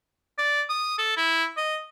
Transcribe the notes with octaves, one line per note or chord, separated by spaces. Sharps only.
D5
D#6
A4
E4
D#5